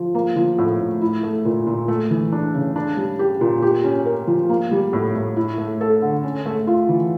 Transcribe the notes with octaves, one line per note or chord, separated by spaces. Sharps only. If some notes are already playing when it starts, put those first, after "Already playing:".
Already playing: F3
A#3
F3
A2
A2
E4
A3
A#2
A#2
A3
E3
D4
C#3
D4
G3
G4
A#2
G4
C#4
A#4
F3
A#3
G3
A2
A2
E4
A3
A4
D3
C#4
A3
F4
E3